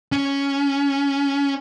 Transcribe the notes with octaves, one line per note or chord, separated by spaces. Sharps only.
C#4